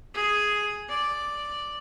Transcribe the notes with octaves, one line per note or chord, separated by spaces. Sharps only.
G#4
D5